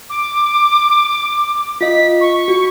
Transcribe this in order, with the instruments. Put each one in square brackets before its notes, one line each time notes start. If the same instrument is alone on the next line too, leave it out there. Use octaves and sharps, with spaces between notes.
[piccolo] D6
[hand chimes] F4 D#5 [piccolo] B6
[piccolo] C#6
[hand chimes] F#4